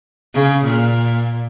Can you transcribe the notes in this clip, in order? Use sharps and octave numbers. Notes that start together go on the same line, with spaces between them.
C#3
A#2